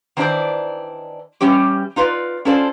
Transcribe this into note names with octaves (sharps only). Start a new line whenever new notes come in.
D#3 E3 D4 E4 C5 D5
E3 G3 C#4 G4
D#4 F4 B4 D5
C#4 E4 F4 A4 C5 D5